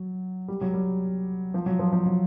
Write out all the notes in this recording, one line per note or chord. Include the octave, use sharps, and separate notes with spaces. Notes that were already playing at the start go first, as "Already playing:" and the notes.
Already playing: F#3
G3
F#3
G3
F3
F#3
F3
F3
F#3